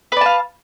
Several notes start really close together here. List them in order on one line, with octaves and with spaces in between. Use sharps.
B4 D5 A5 F5